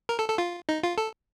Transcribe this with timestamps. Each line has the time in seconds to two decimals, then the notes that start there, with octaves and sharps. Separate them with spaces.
0.09 A#4
0.19 A4
0.29 A4
0.38 F4
0.69 D#4
0.83 F4
0.98 A4